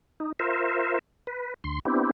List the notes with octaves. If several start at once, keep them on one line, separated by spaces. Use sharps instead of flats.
D#4
F4 A#4 C5 E5
B4
D2 C6
B3 C4 D4 E4 G4